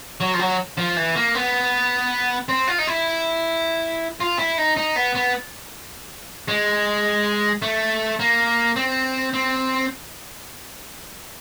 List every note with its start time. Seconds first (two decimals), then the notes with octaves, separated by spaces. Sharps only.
0.20 F#3
0.34 F3
0.39 F#3
0.78 F3
0.97 E3
1.16 A#3
1.35 B3
2.49 C4
2.68 F4
2.78 D#4
2.87 E4
4.20 F4
4.39 E4
4.58 D#4
4.77 D#4
4.96 B3
5.15 B3
6.48 G#3
7.62 A3
8.19 A#3
8.76 C4
9.34 C4